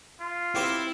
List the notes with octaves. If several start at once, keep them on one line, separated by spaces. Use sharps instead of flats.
F4
C4 E4 G4 C5